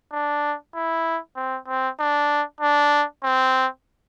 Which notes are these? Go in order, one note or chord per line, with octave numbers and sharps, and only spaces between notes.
D4
E4
C4
C4
D4
D4
C4